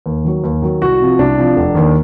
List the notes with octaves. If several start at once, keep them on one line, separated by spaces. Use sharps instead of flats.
D#2
D#3 F#3
D#2
D#3 F#3
C2 F#4
C3 F3
C2 D4
C3 F3
F1
D#2 D#3